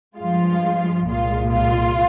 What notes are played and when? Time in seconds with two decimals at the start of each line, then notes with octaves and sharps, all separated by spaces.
0.18 G2 F3 G#3 F4
1.07 C2 A#2 G#3 F4
1.53 F4